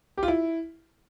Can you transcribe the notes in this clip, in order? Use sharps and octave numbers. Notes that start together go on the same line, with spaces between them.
G4
F4
E4